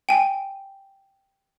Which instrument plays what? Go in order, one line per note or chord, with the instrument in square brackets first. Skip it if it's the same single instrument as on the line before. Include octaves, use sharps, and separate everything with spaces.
[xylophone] G5 G#5